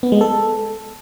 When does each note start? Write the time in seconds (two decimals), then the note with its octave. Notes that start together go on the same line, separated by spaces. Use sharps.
0.03 B3
0.12 G#3
0.21 A4